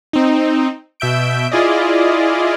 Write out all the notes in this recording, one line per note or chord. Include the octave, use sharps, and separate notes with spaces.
C4 D#4
B2 E5 G6 D7
E4 F4 G#4 D5 D#5